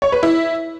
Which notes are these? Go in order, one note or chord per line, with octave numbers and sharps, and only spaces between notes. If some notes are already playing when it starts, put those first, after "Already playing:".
C#5
B4
E4